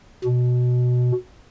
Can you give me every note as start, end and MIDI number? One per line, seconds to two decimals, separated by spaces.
0.25 1.12 47